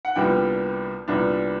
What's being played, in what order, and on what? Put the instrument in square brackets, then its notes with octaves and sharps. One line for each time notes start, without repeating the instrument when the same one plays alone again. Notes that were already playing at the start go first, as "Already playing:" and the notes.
[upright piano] F#5
C2 A#2 G3 B3 D4 G5
C2 A#2 G3 B3 D4